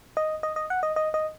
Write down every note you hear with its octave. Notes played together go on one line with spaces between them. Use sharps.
D#5
D#5
D#5
F#5
D#5
D#5
D#5